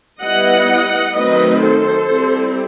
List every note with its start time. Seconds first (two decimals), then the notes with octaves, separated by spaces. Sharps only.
0.21 G3 B3 E4 D#5 F#5
1.14 D#3 F#3 A3 C4 D#4 B4 D#5
1.60 A4 C5
2.06 G3 C4 E4